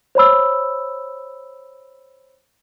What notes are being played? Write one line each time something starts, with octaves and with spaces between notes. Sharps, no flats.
C5 C#5 B5 E6